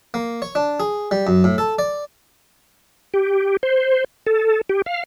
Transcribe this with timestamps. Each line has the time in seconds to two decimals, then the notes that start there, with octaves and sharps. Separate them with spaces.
0.14 A#3
0.42 C#5
0.55 D4
0.80 G#4
1.11 G3
1.27 F#2
1.44 A2
1.58 A4
1.79 D5
3.14 G4
3.63 C5
4.26 A4
4.69 G4
4.86 F5